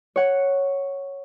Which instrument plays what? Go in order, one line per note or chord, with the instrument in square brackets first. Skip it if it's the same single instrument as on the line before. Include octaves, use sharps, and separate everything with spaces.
[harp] C#5 F#5